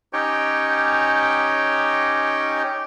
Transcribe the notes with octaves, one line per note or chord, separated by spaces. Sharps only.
C#4 D#4 G4 C#5 G5